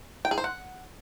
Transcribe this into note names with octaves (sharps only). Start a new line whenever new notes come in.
G5
G#4
C5
F#5